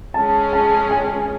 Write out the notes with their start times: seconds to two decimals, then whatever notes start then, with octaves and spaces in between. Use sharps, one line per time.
0.14 G#3 C#4 G#4 A5
0.53 A5
0.91 G#5